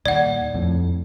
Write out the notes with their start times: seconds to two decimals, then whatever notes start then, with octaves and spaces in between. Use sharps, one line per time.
0.06 D#1 D#2 D5 F#5
0.54 F2 A2